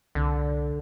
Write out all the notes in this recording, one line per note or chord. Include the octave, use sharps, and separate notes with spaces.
C2 D3